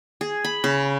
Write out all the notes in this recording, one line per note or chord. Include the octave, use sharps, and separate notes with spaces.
G#4
B5
C#3